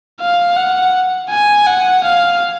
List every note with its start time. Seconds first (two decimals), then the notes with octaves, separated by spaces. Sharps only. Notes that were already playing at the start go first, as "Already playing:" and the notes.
0.20 F5
0.56 F#5
1.30 G#5
1.67 F#5
2.04 F5